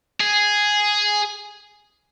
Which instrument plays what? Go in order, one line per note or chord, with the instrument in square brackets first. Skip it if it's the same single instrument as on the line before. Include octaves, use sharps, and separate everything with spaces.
[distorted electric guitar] G#4